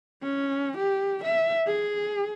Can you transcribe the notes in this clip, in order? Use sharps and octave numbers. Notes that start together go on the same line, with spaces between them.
C#4
G4
E5
G#4